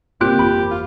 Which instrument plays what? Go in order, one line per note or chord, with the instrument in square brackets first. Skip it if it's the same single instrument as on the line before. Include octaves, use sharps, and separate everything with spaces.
[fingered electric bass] G#2 C#3 [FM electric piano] A#3 C4 [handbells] F4 F#6 D7 [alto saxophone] G4
[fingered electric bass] G1 F2 E3 [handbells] B5
[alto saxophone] F4